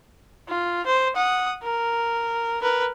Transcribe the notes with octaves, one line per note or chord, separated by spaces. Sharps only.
F4
C5
F#5 D#6
A#4
A#4 B4